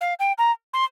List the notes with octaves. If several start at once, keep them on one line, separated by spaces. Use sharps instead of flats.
F5
G5
A#5
C6